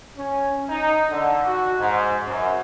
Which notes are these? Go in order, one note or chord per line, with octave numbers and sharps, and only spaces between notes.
C#4
D#4
D3
F#4
G#2
F#2